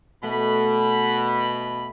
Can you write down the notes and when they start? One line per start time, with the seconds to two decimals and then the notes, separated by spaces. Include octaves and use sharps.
0.23 B2 A3 B5